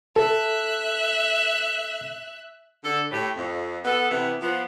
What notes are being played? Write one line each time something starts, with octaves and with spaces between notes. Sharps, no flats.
A4 E5 F#6
D3 A4
A2 G4
F2
B3 A4
C3 E3 B3
F3 B3